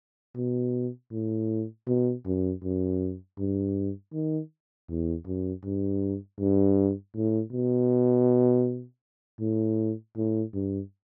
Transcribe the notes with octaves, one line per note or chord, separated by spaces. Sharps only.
B2
A2
B2
F#2
F#2
G2
D#3
E2
F#2
G2
G2
A2
B2
A2
A2
G2